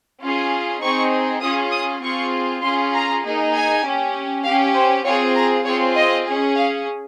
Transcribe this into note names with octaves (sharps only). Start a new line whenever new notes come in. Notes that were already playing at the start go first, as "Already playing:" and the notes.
C#4 F4 G#4
C4 D#4 G#4 C#6
C#4 F4 G#4 D#6
D#6
C4 F4 G#4 C#6
C#4 F4 G#4 C6
A#5
A#3 D#4 G#4
G#5
C#4 G4
C#4 G4 F5
C5
C4 F4 G#4 C#5
A#5
C4 F4 G#4 C#5
D#5
C#4 G#4
F5